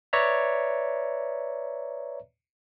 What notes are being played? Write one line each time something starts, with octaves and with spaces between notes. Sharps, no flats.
B4 C#5 D5 E5 A#5